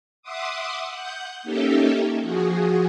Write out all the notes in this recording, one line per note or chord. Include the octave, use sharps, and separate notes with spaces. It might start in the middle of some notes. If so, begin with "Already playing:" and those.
E5 F#5 C6 D6 D#6
F#5 G6
A#3 C#4 D#4 G4 A4 E5
F3 F#4 G#4